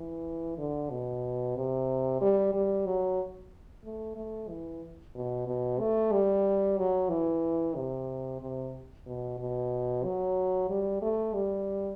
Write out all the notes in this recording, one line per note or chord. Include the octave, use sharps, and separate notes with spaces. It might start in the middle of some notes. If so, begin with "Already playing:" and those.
Already playing: E3
D3
B2
C3
G3
G3
F#3
A3
A3
E3
B2
B2
A3
G3
F#3
E3
C3
C3
B2
B2
F#3
G3
A3
G3